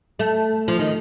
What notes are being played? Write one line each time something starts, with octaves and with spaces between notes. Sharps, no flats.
A3
F3
D#3